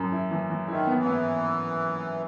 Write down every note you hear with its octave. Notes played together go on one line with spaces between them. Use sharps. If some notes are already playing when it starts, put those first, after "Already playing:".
Already playing: F#2
E4
E3
E3
D#3 E4
B3
E3
B3